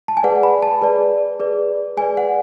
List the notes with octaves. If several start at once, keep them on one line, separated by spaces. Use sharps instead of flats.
A5
G#5
G#4 B4 D5 F#5
B5
A5
G#4 B4 D5
G#4 B4 D5
G#4 B4 D5 G#5
F#5